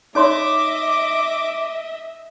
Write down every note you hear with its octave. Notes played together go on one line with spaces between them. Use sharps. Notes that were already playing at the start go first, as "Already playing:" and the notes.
D#4 C#5 D#5 E5 C6 D6